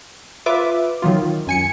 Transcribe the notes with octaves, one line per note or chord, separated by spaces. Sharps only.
F4 B4 E5 D6
D#3 F#3 F4
F#2 G#5 C#7